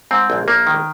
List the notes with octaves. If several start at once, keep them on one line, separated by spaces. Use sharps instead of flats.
G#2 C4
A#1
A#1 A#3
D#3